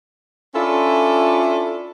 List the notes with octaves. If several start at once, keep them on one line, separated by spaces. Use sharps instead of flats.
C#4 D4 E4 F4 A4